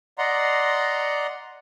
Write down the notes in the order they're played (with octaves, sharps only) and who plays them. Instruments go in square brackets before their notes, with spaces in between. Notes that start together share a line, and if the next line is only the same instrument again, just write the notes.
[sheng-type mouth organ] D5 D#5 F#5 A#5 C6